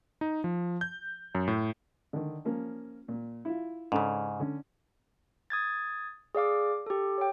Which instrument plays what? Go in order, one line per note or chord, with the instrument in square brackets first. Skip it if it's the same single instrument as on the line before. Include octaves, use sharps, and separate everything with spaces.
[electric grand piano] D#4
F3
G6
F#2
A2
[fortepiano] D3 D#3
F3 A#3 C#4
A#2
E4 F4
[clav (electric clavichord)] G#2 C#3 [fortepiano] C#4 D4 A4
[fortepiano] D3 C#4
[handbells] D#6 G#6 A6
G#4 D5 F5 D6
G4 A4
C#5 G5